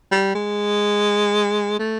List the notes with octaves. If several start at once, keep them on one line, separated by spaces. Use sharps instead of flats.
G3
G#3
A3